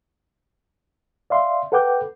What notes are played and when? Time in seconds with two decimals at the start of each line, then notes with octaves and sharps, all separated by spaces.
1.30 D5 E5 F5 C6
1.72 A4 B4 F#5 G5 D6 G6